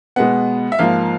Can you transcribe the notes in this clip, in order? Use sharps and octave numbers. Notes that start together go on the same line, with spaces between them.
B2 G#3 B3 F#5
E5
G#2 F3 A#3 F5